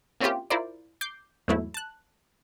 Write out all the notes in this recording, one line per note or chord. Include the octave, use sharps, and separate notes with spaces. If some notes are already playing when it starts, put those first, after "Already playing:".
A#3 C4 C#4 E4 F4 G4
E4 F4 A#4 C5 D5
D6 G6 C7
E2 G#2 F#3 A3 E4
A5 F#6